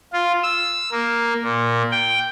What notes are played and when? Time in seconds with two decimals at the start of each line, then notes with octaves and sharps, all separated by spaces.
0.13 F4
0.43 E6
0.92 A#3
1.43 A#2
1.91 G5